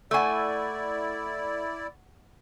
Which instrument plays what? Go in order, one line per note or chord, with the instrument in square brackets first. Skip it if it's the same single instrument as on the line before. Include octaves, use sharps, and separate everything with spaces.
[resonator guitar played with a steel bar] A3 G#5 [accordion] E4 D5 [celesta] F#5 C#6 E6